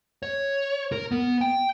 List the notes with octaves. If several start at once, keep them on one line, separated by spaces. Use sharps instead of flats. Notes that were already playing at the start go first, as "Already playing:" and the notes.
C#5
A#4
B3
G5